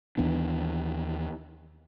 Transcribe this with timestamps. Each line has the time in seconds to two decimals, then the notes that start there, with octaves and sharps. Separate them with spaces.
0.18 D#2 E3 B3 D4